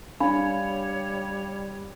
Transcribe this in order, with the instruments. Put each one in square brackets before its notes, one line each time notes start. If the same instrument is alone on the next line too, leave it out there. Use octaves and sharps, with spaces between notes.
[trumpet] G3 [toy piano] D4 B5 [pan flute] C#5 [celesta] F5